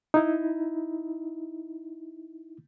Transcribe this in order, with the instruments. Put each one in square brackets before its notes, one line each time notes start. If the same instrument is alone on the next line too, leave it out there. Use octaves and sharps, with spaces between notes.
[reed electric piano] D#4 E4